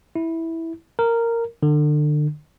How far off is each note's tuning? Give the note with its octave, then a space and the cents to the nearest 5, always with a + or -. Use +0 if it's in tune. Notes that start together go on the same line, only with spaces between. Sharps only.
E4 -10
A#4 -10
D3 +30